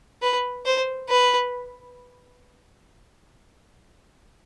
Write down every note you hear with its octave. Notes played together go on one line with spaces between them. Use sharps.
B4
C5
B4